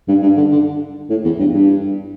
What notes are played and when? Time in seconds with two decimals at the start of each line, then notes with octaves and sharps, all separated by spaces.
0.08 G2
0.23 G2
0.36 D3
0.52 D3
1.10 A2
1.25 E2
1.39 G2
1.53 G2